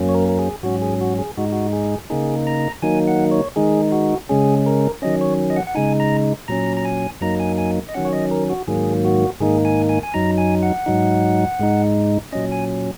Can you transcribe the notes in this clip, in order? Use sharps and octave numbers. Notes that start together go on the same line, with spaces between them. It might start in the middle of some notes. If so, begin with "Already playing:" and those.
Already playing: F#2 F#3 A#3 C#4
C#5
A#4
A#4
G#4
G#2 F#3 C#4 F#4
G#4
F#4
G#4
G#2 G#3 D#4 F#4
F#4
G#4
C#3 A#3 D#4 G#4
A#5
D#3 F#3 A#3 D#4 G#5
F#5
C#5
D#3 G#3 D#4 G#4
F#4
C#3 G#3 C#4 G#4
A#4
D#3 F#3 C#4 D#5
C#5
D#5
F#5
F#5
C#3 G#3 D#4 G#5
A#5
A#2 F#3 C#4 A#5
A#5
G#5
F#2 F#3 A#3 D#4 A#5
G#5
G#5
D#5
D#3 F#3 C#4 F#5
C#5
D#5
A#4
F#4
G#2 D#3 F#3 A#3 G#4
F#4
G#2 D#3 A#3 D#4 G#4
G#5
G#5
G#5
F#2 F#3 D#4 A#5
G#5
F#5
G#2 F#3 D#4
G#2 G#3 D#4
A#2 F#3 C#4 D#5
G#5